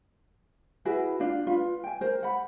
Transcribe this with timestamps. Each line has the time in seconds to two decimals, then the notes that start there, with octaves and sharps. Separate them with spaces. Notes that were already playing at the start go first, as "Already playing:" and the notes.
0.85 E4 F#4 G#4 B4
1.20 D4 F4
1.47 F4 B4
1.84 G5 G#5
2.01 A#4 C5
2.23 F#5 B5